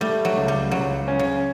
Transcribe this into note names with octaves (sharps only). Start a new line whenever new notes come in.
G3 A3
F#3
C#2
G3
C#2 F#3
C#4
C#3